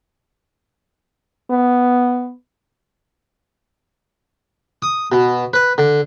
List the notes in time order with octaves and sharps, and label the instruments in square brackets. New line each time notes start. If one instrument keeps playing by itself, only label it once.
[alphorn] B3
[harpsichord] D#6
B2
B4
D3